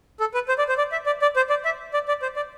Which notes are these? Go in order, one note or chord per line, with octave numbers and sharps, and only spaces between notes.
A4
B4
C5
D5
C5
D5
E5
D5
D5
C5
D5
E5
D5
D5
C5
D5